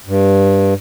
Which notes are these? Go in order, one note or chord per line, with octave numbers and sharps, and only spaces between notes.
G2